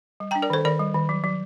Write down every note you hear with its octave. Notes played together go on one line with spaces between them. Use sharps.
G3
D4 G5 A#5
A#4 D5
D#3 A4 C5
D#3 A#4 D5
G3
D#3
F#3
F#3